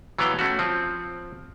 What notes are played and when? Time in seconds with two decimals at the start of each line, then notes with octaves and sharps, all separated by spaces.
0.19 E3 F#3 B3 F5 G5
0.39 A3 C#4 F#4
0.59 F3 C4